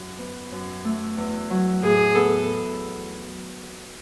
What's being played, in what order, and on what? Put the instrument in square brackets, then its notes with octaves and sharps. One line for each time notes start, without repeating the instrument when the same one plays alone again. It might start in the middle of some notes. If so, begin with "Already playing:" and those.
Already playing: [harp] F#2
B3
F#2
A3
E2
F#3
[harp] A2 [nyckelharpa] G#4
[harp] B3 [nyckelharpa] A4